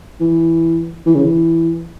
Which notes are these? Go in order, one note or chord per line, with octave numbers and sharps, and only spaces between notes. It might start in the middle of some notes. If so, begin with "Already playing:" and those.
E3
E3
C#3
E3